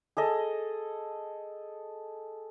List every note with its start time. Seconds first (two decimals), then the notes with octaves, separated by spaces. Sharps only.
0.17 G#4 A4 D#5